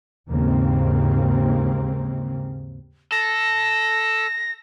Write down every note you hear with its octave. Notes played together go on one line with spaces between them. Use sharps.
D#2 G#2 C#3 A#3 C4
A4 A#6